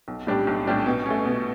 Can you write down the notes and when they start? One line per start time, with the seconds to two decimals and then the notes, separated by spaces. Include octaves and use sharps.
0.08 B1
0.27 A2 G3 D4 G4
0.47 B1
0.66 A2 G3 D4 G4
0.86 B2
1.06 A3 C#4
1.26 B2